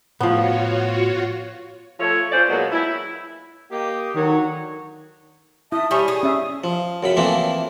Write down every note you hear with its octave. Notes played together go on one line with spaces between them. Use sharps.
A2 F3 B3 F4 F#4 C#5
F3 A3 A4 C#5
C#4 D4 F4 C5 D5
B2 F#3 G#3 A#3 B3
E4
A#3 G4 D#5
D3 D#3 F#3 C#5
E4 E5 A5 D#6
G3 C#5 G#5 C#6
G#4 D#6
C#4 E5
F3
F#2 C#3 B5
E3 F3 A3 A#3 C4 E4